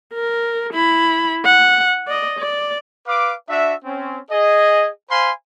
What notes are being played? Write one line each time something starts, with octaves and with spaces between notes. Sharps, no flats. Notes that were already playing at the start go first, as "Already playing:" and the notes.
A#4
E4 B5
F#5
D5 D#5
D5
B4 F5 D6
D4 F#4 E5
C4 C#4
G#4 D#5
C5 F5 G#5 B5 C6